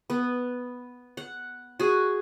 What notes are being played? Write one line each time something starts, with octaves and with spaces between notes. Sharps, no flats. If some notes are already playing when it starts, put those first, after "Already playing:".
B3
F#5
F#4 G#4